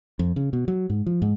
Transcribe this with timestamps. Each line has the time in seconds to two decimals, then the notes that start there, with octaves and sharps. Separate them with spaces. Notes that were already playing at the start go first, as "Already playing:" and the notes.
0.19 F2
0.36 C#3
0.53 B2
0.68 F#3
0.90 G#2
1.06 F3
1.22 G#2